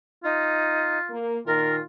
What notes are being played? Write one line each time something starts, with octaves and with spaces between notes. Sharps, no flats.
D#4 F4
A#3
A#2 D#3 F4 A#4